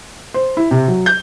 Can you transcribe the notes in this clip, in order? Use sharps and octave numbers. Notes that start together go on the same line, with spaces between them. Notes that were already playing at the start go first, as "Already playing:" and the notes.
C5
E4
C3
F#3
G6